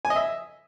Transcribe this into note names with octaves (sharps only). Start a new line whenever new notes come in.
G#5
D#5
E5